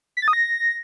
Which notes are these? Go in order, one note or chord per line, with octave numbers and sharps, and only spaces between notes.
B6
A6
D#6
A#6